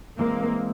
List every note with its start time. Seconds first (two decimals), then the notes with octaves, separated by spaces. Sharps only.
0.19 E3 G#3 A#3 C4